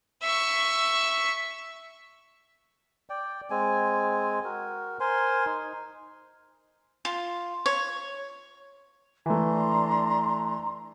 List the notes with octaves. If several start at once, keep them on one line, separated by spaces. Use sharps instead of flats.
E5 C#6
D5 G5
G#3 C4 G#5
F#4 A#4
A#4 C5 G#5 C6
D#4
F4
C#5
E3 A3 D4 A#5 C6